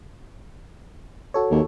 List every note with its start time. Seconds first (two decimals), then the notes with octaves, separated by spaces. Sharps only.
1.34 F#4 A4 C#5
1.51 D#2